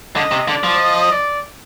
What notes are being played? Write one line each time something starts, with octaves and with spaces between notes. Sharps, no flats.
D3 D#5
C3
D3 D5
F3
D#5
D5